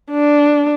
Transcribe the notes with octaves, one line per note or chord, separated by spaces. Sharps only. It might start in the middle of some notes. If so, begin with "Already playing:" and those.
D4